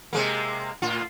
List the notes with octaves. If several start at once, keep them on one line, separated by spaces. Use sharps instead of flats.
C3 G#3 A#3
A2 F4